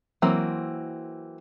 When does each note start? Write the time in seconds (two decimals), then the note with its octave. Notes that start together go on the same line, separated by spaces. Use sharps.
0.22 E3 F#3 A#3 C4